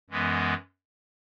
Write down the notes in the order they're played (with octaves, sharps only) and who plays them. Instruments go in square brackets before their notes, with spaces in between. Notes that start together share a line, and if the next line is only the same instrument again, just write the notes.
[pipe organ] F#2 E3 G#3 B3